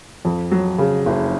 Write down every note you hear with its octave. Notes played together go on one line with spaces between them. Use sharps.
F2
F#3
C#3
F#1